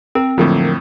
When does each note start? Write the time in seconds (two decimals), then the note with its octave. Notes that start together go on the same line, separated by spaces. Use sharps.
0.15 C4 A#4
0.38 F2 A2 D3 F3 F#3 A#3